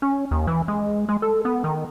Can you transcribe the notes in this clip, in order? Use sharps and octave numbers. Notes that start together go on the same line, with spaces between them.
C#4
D#2
E3
G#3
G#3
A4
B3
D#3